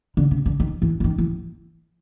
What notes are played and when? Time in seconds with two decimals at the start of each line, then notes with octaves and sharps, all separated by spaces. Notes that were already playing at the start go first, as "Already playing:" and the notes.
0.17 D3
0.31 C3
0.46 D3
0.60 D#3
0.82 E3
1.00 E3
1.04 D#3
1.18 E3